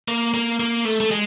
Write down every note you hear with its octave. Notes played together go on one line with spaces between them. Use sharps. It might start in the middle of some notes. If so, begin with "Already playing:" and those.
A#3
A#3
A#3
A3
A3
G#3